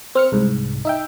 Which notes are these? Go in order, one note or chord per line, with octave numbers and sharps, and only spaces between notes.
C4 F6 C#7
C2 G#2
D#4 E5 G5